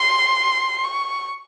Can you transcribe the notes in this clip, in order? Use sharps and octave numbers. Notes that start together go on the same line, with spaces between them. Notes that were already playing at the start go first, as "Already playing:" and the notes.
Already playing: C6
C#6